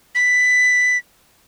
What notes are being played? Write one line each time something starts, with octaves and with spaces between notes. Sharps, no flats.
B6